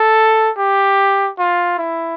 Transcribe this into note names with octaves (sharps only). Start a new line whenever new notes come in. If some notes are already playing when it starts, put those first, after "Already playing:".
Already playing: A4
G4
F4
E4